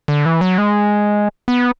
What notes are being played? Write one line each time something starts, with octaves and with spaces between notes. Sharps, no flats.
D3
E3
F#3
G#3
B3